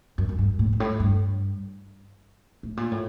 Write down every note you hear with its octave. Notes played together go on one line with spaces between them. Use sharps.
F#2
F#2
G2
A2
G2
A2
G2
A2
A#2
A2